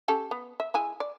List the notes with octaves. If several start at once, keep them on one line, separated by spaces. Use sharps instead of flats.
C#4 G4 A4
B3
E5
G#3 E4 G#5
D5